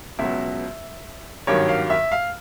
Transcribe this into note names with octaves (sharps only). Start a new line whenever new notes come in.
C#2 B2 F#3 E5
G#1 G2 D#3 F#3 C#5
F5
E5
F5